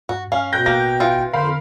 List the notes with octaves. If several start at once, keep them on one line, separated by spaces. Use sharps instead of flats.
G2 F#4
G2 C#4 F5
B2 G5 F#6 G6 A#6
A1 A#3 A#6
E3 F4
F2 D3 A#4 C5 F5 B5